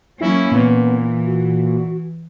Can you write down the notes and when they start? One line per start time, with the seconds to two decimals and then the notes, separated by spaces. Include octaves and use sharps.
0.21 F#3 A#3 C#4 E4
0.52 A#2 E3 B3
1.26 F#4